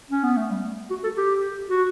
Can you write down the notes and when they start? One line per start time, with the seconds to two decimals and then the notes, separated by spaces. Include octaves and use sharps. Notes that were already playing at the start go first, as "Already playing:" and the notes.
0.11 C#4
0.23 B3
0.37 A3
0.51 G3
0.90 F#4
1.04 A4
1.17 G4
1.70 F#4